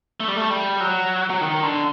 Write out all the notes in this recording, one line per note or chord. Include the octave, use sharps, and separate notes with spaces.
A3
G3
A3
G3
F#3
F#3
D#3
D3